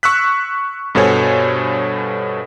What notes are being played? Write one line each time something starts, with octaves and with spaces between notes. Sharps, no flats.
C#6 E6 F#6 B6
G2 B2 A4 C5 C#5 G#5